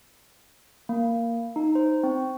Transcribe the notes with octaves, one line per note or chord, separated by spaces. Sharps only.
A#3
D#4
C5
C4